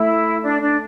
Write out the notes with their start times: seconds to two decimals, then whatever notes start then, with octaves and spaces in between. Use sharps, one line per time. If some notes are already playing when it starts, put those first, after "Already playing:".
Already playing: A3 E4
0.42 D4
0.60 D4